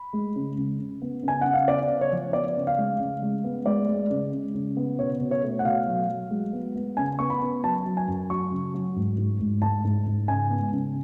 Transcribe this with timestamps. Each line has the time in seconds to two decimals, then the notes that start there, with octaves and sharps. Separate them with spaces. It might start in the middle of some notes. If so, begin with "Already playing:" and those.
Already playing: B5
0.13 G#3
0.36 C#3
0.57 C#3
0.79 C#3
1.02 B3
1.23 C#3 G#5
1.41 C#3 F#5
1.54 F5
1.68 B3 D5
1.89 C#3
2.01 C#5
2.12 F3
2.33 B3 D5
2.56 C#3
2.67 F5
2.78 G#3
3.00 C#3
3.22 G#3
3.44 B3
3.66 G#3 D5
3.89 G#3
4.10 C#3
4.33 C#3
4.54 C#3
4.77 B3
4.99 B2 C#5
5.20 B2
5.31 C#5
5.43 A3
5.59 F#5
5.64 B2 F5
5.87 F#3
6.09 F#3
6.31 G#3
6.53 B3
6.75 B3
6.97 C#3 G#5
7.19 B3 C#6
7.30 B5
7.42 B3
7.64 F#3 A5
7.86 F#3
7.97 G#5
8.08 F#2
8.30 F#3 C#6
8.51 C#3
8.74 F#3
8.96 G#2
9.18 G#2
9.40 G#2
9.62 G#2 A5
9.84 G#2
10.07 G#2
10.28 C#3 G#5
10.50 B3
10.73 C#3